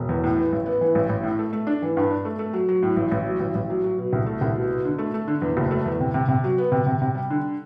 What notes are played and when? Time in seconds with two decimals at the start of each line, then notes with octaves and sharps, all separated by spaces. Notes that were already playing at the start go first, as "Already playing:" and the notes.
Already playing: E1
0.09 E2
0.24 A2
0.38 E3
0.52 A1
0.66 B3
0.81 E3
0.95 A1
1.09 A1
1.23 A2
1.39 A3
1.53 A3
1.67 D4
1.82 E3
1.97 G2
2.11 D4
2.25 A3
2.39 A3
2.53 F#3
2.68 F#3
2.83 A2
2.97 A1
3.12 A1
3.26 F#3
3.40 A1
3.55 A1
3.70 F#3
3.84 F#3
3.98 B2
4.13 C2
4.26 A3
4.41 C2
4.56 B2
4.71 B2
4.85 D3
4.98 A3
5.14 A3
5.28 D3
5.42 E2
5.57 F#1
5.71 A3
5.86 E2
6.00 C3
6.14 C3
6.28 C3
6.44 F#3
6.58 B3
6.72 C3
6.86 C3
7.02 C3
7.15 G3
7.30 D3